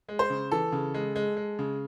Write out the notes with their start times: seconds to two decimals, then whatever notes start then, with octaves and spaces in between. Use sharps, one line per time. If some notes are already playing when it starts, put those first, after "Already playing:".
0.09 G#3
0.19 C5
0.30 C#3
0.52 E3 A4
0.72 C#3
0.94 G#3
1.16 G#3
1.37 G#3
1.59 C#3